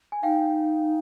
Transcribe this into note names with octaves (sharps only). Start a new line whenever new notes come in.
G#5
D#4 F5 G5